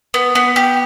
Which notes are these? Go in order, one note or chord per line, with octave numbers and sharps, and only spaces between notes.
B3
B3
G4